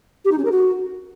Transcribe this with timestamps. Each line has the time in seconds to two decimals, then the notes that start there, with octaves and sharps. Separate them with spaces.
0.24 G4
0.31 D#4
0.38 C#4
0.45 A#4
0.51 F#4